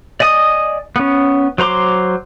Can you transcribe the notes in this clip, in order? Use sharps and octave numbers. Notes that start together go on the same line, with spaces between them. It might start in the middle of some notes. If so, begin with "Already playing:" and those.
D5 D#5 G#5 D#6
B3 C#4
F#3 C5 A#5 C6 D6